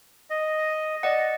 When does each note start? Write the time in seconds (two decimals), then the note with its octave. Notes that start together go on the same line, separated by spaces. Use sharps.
0.30 D#5
1.03 D5 D#5 F#5